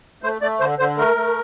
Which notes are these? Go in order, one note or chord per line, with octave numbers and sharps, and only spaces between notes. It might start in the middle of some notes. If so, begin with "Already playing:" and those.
A3 C5
A3 D5
D3 C5
D3 C5
A3 A#4
A3